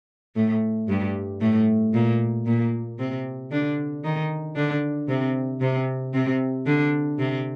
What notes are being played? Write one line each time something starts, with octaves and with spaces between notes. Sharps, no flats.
A2 A3
G2 G3
A2 A3
A#2 A#3
A#2 A#3
C3 C4
D3 D4
D#3 D#4
D3 D4
C3 C4
C3 C4
C3 C4
D3 D4
C3 C4